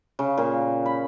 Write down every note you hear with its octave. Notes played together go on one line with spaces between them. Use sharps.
C#3
A#2
B5